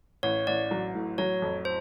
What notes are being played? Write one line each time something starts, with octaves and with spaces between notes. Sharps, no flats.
A1 C#5
A1 D5
F#3
A2
F#3 C#5
F2
C5